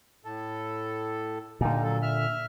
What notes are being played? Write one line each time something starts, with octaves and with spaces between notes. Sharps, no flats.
A2 A4
A#2 D3 G3 D#4
F#3 A4
E5 F6